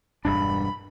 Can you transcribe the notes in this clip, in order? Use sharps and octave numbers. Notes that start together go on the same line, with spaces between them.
E1 G2 D4 B5